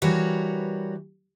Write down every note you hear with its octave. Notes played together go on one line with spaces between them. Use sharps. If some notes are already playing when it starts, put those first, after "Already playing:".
E3 G3 F#4 A#4 B4 C#5